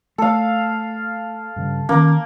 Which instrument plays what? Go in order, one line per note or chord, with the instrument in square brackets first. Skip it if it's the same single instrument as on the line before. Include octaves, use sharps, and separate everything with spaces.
[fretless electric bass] A3 [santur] A4 F5
[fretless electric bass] G2 C#3
[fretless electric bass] D#3 C#4 [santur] A#3